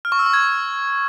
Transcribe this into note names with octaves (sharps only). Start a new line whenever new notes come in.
F6
C#6
E6
C#6
G#6